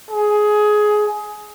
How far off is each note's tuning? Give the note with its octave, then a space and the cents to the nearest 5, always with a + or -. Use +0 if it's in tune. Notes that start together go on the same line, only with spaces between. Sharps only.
G#4 +15